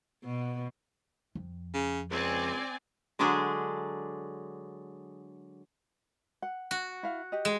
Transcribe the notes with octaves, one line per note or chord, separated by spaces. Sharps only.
B2
F2
C#3
C#2 C4 D5 G#5
D3 F#3 G#3 D4 G#4
F#5
F#4
E4 F5
G4 D#5
G#3